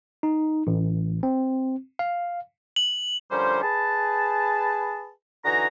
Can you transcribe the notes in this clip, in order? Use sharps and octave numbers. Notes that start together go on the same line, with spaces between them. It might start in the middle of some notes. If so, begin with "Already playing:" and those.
D#4
A1
C4
F5
F#7
D3 F3 G3 C#4 A#4 C5
G#4 B4 A5
D3 E3 D#4 F#4 G#5 A#5